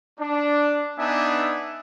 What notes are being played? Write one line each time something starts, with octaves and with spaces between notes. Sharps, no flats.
D4
B3 D4 D#4 E5 G#5